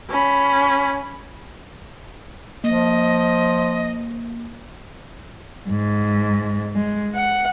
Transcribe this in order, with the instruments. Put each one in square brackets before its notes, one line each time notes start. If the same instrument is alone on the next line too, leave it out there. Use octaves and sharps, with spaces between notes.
[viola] C#4 B5
[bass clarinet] F3 [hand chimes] A#3 [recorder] D#5
[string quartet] G#2
G#3
F#5